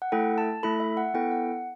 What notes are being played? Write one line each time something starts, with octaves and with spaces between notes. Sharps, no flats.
F#5
A3 E4 A4 G5
A5
A3 E4 A4 B5
E5
F#5
B3 E4 A4 G5
F#5